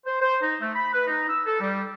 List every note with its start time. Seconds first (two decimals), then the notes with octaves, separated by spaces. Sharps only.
0.06 C5
0.21 C5
0.41 D#4
0.60 A3
0.75 B5
0.93 B4
1.07 D#4
1.29 E6
1.46 A4
1.60 G3